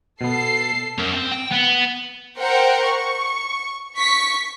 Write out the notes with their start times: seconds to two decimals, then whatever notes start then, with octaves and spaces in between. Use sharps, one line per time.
0.21 B2 B3 A4 C7
0.98 C#4 A#4
1.15 C4
1.32 G5
1.52 B3
2.38 A#4 C5 F#5 G5
2.86 C#6
3.98 C#6 B6